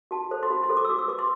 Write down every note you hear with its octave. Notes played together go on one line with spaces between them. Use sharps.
F#4 A5
A4 C5
C6
F#4 B5
C6
A4 C5
D6
E6
F#4 D6
E6
B4 D6
C6